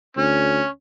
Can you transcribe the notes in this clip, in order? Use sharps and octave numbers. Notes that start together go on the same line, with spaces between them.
D2 C#4